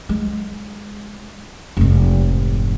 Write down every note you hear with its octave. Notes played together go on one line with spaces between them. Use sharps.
G#3
F1 G#2